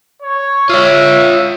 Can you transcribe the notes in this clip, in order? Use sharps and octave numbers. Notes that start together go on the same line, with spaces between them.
C#5
F4 C#5 E5